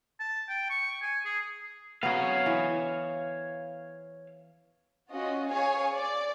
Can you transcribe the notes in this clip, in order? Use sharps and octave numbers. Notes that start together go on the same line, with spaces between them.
A5
G5
C#6
G#5
G#4
F#3 B3 C#5 F5
E3
C#4 F4 F#4 D#5
G#4 C#5 F5 G#5
D5